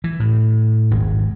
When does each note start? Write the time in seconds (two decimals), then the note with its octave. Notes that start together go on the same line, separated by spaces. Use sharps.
0.04 E3
0.20 A2
0.90 D#1 G#1 G#3